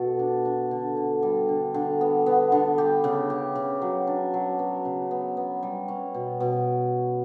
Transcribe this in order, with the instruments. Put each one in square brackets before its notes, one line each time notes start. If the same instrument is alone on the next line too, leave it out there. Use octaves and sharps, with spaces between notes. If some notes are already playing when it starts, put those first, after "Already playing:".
Already playing: [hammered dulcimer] B2 F#4 A4
D4
D4
D3
D3
G3
D3
D3
B3
B3
D3
G4
C#3
G4
C#3
F#3
D4
F#3
B3
C#3
B3
B3
G3
C#4
B2
B2